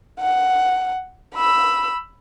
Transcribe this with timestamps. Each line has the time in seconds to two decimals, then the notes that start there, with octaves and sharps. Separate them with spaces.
0.20 F#5
1.35 B5 E6